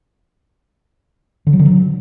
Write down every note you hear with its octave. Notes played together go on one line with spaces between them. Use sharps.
D3
F#3
D3
F#3